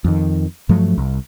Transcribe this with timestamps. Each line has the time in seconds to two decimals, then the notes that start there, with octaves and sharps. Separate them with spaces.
0.04 F2 D#3
0.69 G2 F3 F#3 A3
0.98 C2